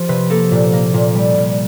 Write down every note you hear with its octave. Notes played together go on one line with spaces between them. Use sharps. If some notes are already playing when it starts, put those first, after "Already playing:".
Already playing: F3 G4
C3 B4
A#3 A4
A#2
A#3
A#2
G3
A#2